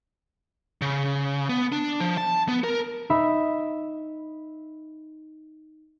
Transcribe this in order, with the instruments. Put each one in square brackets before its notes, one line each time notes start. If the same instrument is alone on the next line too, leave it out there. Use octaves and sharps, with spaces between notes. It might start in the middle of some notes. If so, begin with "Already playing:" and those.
[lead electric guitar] C#3
B3
D4
F3
A5
B3
A#4
[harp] D#4 E5 B5